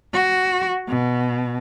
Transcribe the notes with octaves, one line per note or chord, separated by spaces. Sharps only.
F#4
B2